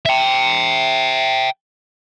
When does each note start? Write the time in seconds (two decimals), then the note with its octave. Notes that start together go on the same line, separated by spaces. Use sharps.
0.06 E5 G5